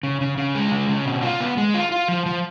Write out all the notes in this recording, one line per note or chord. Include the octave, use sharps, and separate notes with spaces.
C#3
C#3
C#3
G#3
C#3
C#3
B2
F4
B3
G#3
F4
F4
F3
F3